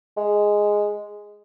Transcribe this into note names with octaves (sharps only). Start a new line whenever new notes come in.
G#3